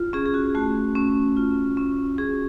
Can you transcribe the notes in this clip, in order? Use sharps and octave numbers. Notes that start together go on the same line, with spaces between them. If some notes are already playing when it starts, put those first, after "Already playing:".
Already playing: F4
C#4 G#4
G#4
F#4
A3 F#4
C#4
F4
C#4
C#4 G#4